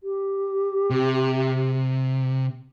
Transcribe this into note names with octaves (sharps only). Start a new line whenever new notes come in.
G4
C3